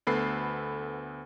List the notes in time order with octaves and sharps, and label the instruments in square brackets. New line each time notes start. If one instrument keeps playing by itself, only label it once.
[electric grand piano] D2 B3 A4 B4 B5 C7